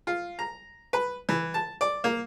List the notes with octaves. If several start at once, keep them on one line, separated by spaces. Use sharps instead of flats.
F4
A#5
B4
E3
A5
D5
A#3